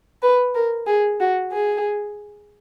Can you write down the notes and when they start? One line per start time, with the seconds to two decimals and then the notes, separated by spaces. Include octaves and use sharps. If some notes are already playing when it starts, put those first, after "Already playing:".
0.23 B4
0.54 A#4
0.87 G#4
1.20 F#4
1.52 G#4